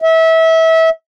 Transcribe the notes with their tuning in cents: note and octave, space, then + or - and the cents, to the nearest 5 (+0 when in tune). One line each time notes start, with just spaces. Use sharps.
E5 -25